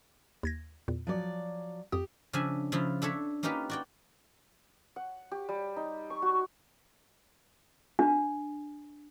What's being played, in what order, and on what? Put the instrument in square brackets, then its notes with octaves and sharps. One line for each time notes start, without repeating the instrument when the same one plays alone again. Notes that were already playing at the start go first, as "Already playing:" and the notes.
[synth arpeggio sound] D#2 G#6 A#6
E2 A#2
[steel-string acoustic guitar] F3 F#3 D5
[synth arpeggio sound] F2 D#6 [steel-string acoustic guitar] G4
[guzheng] C#3 F3 D4 E5 G#5
C#3 F3 E4 F4
D4 A4 C#5 E5
A#3 C#4 D#4 F4 G4 B4
F#4 D5 G5
[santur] F#5
G4
G3
D#4
C#6
F#4
[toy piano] D4